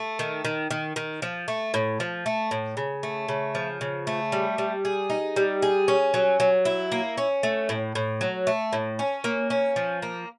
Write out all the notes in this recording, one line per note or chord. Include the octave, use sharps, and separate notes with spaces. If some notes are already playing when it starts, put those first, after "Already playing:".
Already playing: A3
D#3
D#3
D#3
D#3
F3
A3
A2
F3
A3
A2
C#3
A3
C#3
F3
C#3
A3
G3
G3
G#4
D#4
G3
G#4
C#4
F#3
F#3
E4
A#3
C#4
A3
A2
A2
F#3
A3
A2
C#4
A#3
C#4
F3
A#3